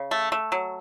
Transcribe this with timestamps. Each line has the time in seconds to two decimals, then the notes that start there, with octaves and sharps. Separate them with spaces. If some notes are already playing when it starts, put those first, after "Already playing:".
Already playing: C#3
0.11 A3
0.32 A3
0.52 F#3